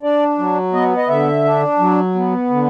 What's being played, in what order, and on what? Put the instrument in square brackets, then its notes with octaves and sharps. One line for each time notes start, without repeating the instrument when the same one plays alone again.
[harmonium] D4 D5
F#3
B3 D#5
D#5
D3 E5
D4
F#3
B3
D3